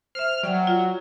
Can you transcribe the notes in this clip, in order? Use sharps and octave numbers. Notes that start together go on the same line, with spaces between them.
C5 E5 F6
F#3 D5 F#5 G5
F4